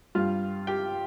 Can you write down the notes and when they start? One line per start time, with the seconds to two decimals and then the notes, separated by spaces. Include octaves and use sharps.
0.15 G2 G3 F4 F5
0.67 G4 G5